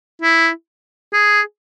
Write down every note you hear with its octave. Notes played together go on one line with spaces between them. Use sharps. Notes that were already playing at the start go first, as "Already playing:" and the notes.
E4
G#4